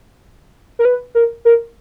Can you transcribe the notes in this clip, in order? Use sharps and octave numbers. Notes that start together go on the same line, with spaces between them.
A#4
B4
A#4
A#4